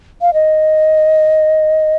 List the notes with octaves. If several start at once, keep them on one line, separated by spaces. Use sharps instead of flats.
F5
D#5